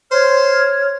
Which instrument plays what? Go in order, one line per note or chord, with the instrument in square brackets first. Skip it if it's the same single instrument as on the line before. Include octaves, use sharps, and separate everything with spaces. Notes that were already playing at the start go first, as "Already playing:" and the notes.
[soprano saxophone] C5 [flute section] C#5 F6